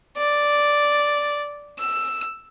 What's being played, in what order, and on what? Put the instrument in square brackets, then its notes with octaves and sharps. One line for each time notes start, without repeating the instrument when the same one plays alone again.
[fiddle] D5
E6